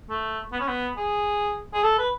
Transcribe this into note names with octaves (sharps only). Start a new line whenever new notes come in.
A3
B3
C#4
B3
G#4
G#4
A4
B4